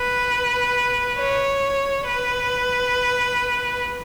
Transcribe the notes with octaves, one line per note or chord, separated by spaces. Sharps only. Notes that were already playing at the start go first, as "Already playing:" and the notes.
Already playing: B4
C#5
B4